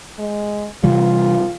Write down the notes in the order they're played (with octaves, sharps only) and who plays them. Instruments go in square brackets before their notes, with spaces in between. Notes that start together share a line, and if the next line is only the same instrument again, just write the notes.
[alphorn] G#3
[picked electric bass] C3 E3 G3 [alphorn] F4